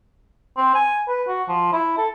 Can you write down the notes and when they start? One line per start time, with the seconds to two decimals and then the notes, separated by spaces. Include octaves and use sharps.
0.57 C4
0.74 G#5
1.08 B4
1.28 F#4
1.48 F3
1.72 E4
1.97 A4